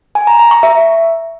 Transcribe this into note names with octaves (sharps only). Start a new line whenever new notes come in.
G#5
A#5
A#5
C#6
E5